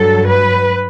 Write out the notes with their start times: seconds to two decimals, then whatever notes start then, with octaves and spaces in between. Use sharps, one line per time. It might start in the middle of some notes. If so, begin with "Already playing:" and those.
Already playing: G2 F#3 A4
0.27 B4